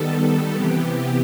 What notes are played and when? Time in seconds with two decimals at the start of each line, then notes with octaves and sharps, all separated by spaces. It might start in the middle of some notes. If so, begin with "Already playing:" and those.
Already playing: D#3 G3 B3 A4
0.55 C3 E3 B3 G4